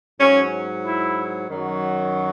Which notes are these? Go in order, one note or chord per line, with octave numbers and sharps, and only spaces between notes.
G#2 F#3 C#4
E4
F#2 D#3 F#3